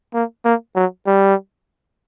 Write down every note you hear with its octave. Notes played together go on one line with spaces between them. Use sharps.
A#3
A#3
F#3
G3